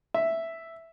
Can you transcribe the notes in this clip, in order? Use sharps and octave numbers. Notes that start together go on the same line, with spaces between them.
E5